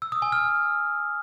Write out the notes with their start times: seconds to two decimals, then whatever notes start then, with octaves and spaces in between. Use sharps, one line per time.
0.02 E6
0.12 D#6
0.22 G#5
0.32 F6